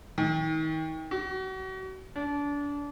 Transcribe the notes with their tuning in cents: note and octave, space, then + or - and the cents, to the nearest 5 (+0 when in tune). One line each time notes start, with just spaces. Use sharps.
D#3 +35
F#4 +35
D4 -30